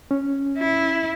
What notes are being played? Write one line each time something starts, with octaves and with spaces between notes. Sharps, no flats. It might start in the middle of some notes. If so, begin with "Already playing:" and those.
C#4
E4